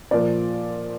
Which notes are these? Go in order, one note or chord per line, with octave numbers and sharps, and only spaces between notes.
A#2 F3 A#3 D5